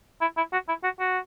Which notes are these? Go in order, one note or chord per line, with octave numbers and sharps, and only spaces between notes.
E4
E4
F#4
E4
F#4
F#4